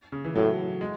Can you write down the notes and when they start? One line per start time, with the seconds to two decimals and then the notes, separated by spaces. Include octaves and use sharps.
0.12 C#3
0.24 E3
0.35 A2 F#3
0.81 G#3